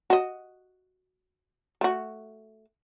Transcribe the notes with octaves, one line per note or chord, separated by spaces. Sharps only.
F#4 D#5
A3 F#4